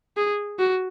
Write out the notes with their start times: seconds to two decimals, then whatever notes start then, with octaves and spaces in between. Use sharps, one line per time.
0.17 G#4
0.59 F#4